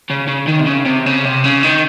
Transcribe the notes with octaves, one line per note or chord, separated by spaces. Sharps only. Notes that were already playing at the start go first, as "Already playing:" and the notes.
C#3
C#3
D#3
C3
C#3
C3
C#3
C3
C#3
D#3